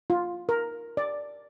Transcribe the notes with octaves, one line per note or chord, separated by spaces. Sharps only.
F4
A#4
D5